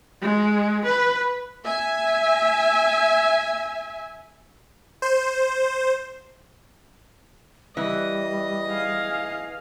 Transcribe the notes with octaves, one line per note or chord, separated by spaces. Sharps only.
G#3
B4
E5 G#5
C5
E3 G3 D#5
G#4 F5